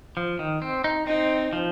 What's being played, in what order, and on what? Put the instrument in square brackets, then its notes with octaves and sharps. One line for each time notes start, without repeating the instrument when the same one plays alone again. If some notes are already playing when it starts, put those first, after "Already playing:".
[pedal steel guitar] F3
D#3
C4
D#4
[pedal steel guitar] C4 [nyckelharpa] D#4
[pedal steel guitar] F3